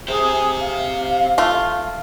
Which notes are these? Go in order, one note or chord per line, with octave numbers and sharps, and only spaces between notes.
G4 G#4 C5
F5
A3 F4